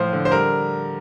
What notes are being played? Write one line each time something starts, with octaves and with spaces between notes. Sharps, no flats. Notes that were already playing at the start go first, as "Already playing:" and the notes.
Already playing: A2 F3 C5
D3
C5
G3 A#4